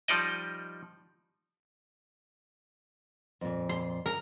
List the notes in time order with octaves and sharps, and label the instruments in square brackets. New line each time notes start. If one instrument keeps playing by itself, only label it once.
[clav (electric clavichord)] F3 G3 D#4 D5 D#5
[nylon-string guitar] F2 A#2
[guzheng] C6
A#4